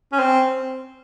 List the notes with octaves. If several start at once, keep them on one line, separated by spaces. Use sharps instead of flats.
C#4
C4